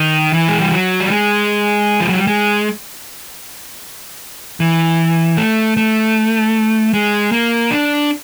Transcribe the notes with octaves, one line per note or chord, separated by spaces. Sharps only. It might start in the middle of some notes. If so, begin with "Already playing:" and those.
Already playing: D#3
E3
G#3
G3
F#3
G3
G#3
F3
F#3
G3
G#3
E3
A3
A3
G#3
A#3
D4